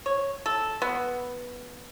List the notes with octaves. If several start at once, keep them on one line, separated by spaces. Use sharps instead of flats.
C#5
A4
B3